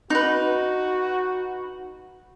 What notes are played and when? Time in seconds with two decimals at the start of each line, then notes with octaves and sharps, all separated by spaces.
0.10 D#4 F#4 B4